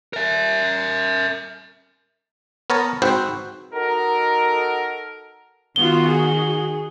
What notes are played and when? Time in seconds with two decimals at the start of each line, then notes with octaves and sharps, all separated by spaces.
0.13 A#4 E5
2.70 B3 A#4 C#5 A5 A#5
3.02 G#2 C4 F#4 B4 C5 F#5
3.73 D#4 F#4 A4 A#4
5.76 D#3 B3 F4 F#4 G7
6.08 G#4